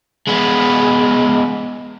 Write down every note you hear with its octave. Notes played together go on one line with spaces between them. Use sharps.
G#3 B3